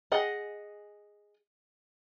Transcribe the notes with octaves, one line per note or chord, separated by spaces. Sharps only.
G#4 D#5 F#5